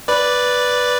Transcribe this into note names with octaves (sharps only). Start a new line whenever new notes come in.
B4 D5